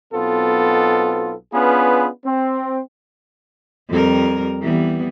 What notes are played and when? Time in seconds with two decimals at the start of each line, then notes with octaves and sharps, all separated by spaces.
0.13 B1 B2 B3 C4 F4 A4
1.53 B3 C#4 D4 F4 G#4 B4
2.25 C4
3.89 F2 G3 A#4
4.62 E3 G3 B3